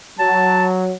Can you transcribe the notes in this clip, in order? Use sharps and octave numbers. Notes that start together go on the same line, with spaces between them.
F#3 A5